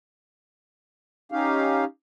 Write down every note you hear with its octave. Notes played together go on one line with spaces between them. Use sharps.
C#4 D#4 G4 F5